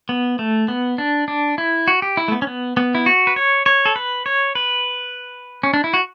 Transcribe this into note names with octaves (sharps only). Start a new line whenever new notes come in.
B3
A3
B3
D4
D4
E4
F#4
G4
E4
A3
B3
C#4
B3
B3
E4
F#4
B4
C#5
C#5
A4
B4
C#5
B4
C#4
D4
E4
F#4